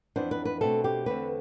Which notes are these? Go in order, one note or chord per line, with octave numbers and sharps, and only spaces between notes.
F2 E3 B3 D4 C5
B4
B4
B2 A3 C4 A4
G4
E2 D3 A3 C4 B4